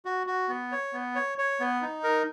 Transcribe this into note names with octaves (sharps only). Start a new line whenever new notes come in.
F#4
F#4
B3
C#5
B3
C#5
C#5
B3
D#4
A#4